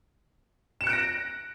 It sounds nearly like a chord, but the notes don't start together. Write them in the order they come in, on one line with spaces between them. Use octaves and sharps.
E7 C#7 F#6 D7 A#6